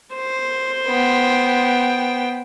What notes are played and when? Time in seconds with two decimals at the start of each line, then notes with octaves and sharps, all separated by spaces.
0.15 C5
0.87 B3 G5